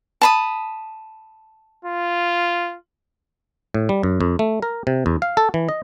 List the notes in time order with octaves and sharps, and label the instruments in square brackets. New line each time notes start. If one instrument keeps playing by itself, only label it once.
[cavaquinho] A5 B5 D#6
[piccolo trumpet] F4
[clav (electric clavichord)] A2
G3
F#2
F2
A3
A#4
C3
E2
F5
A4
E3
D#5